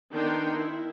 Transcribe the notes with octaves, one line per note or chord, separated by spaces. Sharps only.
D#3 B3 D4 A#4 G5 C6
E4